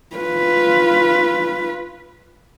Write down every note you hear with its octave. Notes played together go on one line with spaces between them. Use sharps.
F4 B4